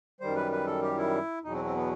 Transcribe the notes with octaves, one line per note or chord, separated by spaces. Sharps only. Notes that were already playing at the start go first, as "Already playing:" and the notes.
F#2 D#3 G3 C5
B4
B4
A4
G4
E4
E2 B2 F#3 D#4
C4
C4
B3